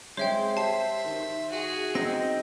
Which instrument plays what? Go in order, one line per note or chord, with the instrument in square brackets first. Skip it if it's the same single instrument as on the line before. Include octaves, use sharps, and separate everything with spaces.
[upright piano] G#3 C4 [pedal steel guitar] C5 [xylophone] C#5 E5 G5
[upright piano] G4 [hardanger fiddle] E5 [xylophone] A5 C7
[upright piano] D#3
[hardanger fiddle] F#4 G#4
[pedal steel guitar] C4 D#4 G5 [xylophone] A#6